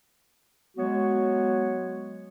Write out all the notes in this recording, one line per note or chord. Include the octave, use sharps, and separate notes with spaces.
F#3 G#3 B3 F#4 C#5